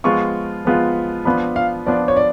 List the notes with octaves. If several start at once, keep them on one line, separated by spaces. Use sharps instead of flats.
F3 G#3 B3 F4 C#6
F3 G#3 B3 F4
F3 B3 D4 F4 B5
F5
F3 B3 D4 F4 D5
C#5
D5